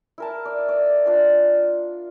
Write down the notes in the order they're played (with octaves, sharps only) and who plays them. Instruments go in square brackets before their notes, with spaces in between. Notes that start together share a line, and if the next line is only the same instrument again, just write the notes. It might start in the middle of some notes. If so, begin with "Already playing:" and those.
[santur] E4 A#4 A5
D5
D5
D4 F4 D6